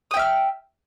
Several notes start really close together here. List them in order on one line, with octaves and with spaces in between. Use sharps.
D#6 G5 E5 F6